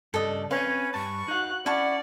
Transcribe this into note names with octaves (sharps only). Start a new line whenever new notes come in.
G2 C#3 A4 D5 D#5
C4 C#4 B4 F5
G2 A5 C#6
D#4 F#4 F5 F#6
C#4 E4 D5 F#5 A5 C#6